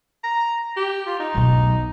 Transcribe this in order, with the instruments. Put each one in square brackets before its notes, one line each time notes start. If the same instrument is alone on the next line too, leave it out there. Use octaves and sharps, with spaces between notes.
[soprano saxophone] A#5
G4
F4
D#4
[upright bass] B1 B2